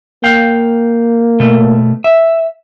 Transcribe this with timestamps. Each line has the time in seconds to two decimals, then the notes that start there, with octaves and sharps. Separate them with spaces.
0.24 A#3 F5 G5
1.40 B2 A3
2.04 E5